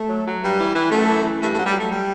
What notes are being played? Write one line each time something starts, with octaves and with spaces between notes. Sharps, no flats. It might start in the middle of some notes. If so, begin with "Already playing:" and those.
Already playing: A3
F#3
F#3
G2 G3
E3
E3
F#2 A3
E3
E3
G2 A3
A3
F#3
G3
F#3 A3
G3